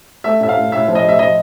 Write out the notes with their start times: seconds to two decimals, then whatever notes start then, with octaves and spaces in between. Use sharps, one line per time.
0.24 A3 E5
0.40 A2 E5
0.49 F5
0.57 A2
0.72 A2 E5
0.88 F3
0.95 D#5
1.04 A2 E5
1.19 F3 D#5